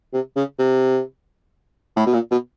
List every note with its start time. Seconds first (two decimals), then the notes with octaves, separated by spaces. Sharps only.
0.13 C3
0.36 C#3
0.59 C3
1.97 A2
2.06 B2
2.14 A#2
2.31 B2